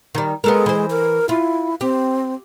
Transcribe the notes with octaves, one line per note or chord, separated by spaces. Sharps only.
D#3 G3
G#3 B3 A4 A#4
E3 C5
A#4
E4 F4
C4 G4